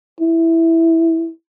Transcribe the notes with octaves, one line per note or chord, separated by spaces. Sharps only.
E4